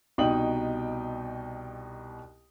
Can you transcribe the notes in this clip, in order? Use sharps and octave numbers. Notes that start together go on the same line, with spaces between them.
C2 B2 D#4 G5 D#6 F#7